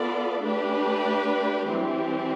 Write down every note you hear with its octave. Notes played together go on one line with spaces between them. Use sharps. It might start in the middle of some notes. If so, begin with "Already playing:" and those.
Already playing: B3 F4 A4 D5
A3 D4 G4 B4
E3 G3 C4 G4